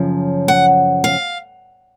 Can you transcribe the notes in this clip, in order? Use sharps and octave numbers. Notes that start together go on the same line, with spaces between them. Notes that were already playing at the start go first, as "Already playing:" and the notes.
Already playing: F#2 C#3 F3
F#5
F5